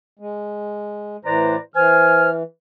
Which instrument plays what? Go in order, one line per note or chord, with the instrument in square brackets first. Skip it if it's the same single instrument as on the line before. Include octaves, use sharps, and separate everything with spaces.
[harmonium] G#3
[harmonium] A2 E3 C5 [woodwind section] B4 D5 A#5
[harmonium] E3 [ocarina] C5 [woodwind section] G#5 F6